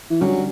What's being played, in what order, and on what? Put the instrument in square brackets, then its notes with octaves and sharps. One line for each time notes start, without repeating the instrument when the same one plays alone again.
[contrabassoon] E3
[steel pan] D3 G3 C#4 [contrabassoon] F#3